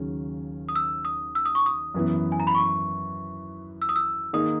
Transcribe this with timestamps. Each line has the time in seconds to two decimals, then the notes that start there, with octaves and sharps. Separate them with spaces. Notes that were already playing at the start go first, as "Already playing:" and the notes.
Already playing: D#2 C#3 F#3 C#4 G#4
0.69 D#6
0.76 E6
1.05 D#6
1.35 E6
1.45 D#6
1.55 C#6
1.66 D#6
1.94 F#2 E3 B3
2.32 G#5
2.40 A#5
2.47 B5
2.55 C#6
3.82 E6
3.89 D#6
3.96 E6
4.33 D#3 A#3 D#4 G#4 D#6